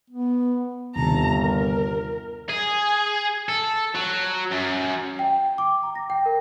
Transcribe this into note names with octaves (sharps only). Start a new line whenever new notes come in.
B3
G1 D#2 C3 D#3 A5 A#5
A#4
G#4
A4
F#3
F#2
G5
D6
A#5
A#6
G5
A#4